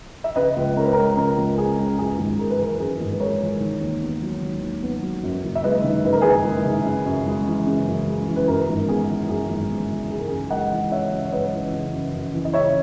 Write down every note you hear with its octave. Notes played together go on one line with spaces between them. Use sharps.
E5
C#3 B4 D#5
C#2
C#4 A#4
B4
G#3 A#4
C#3 A#4
C#2
C#4 G#4
G#3
F#2 G#4
G#1
G#3 A#4
B4
E3 A#4
F#2 G#4 B4
G#1
B4
G#3 A#4 C#5
E3
D#3
D#2
B3
F#3
D#3
D#2
B3
F#3
F#2
F#1
E5
G#3 B4 D#5
D#3
F#2 B4
A#4
F#1 G#4 B4
G#3
D#3
C#3
F#2
G#3
E3
C#3
F#2
G#3
E3
B4
F#2 A#4
G#1
B3 G#4
E3
F#2 G#4
G#1
B3
E3
C#3 G#4
A#4
F#2 G#4
G#3 D#5 F#5
E3
C#3 C#5 E5
F#2
C#5
G#3 B4 D#5
E3
C#3
F#2
F#2
E3
D#5
C#3 C#5 E5